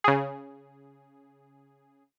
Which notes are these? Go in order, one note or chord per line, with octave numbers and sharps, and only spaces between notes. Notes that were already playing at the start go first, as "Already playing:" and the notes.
C#3 G#4